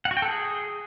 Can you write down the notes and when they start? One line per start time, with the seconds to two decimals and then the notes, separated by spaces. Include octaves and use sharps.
0.05 F#5
0.11 F#4
0.17 G5
0.22 A4
0.28 G#4